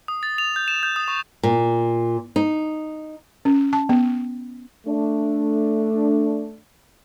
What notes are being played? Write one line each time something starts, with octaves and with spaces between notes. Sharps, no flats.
D#6
A6
F7
G6
E7
G6
D#6
C#6
A#2
D#4
C#4
A5
B3
A3 D4